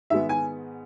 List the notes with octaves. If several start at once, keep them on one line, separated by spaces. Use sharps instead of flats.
G#2 D#3 G#3 B3 E5
G#5